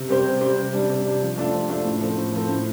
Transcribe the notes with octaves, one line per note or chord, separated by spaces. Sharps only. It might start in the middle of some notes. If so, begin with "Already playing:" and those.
Already playing: C3
G3 C4 G4 C5
C3
G3 C4 G4 C5
C3
G3 D4
C3
G3 D4
F3
A3 D4 F4
F3
A3 D4 F4
A2
F3 C4 A4
A2
F3 C4 A4
A2